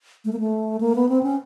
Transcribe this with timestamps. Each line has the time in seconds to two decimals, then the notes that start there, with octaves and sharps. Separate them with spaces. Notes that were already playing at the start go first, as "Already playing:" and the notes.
0.25 A3
0.33 A#3
0.40 A3
0.81 A#3
0.95 B3
1.09 C4
1.23 C#4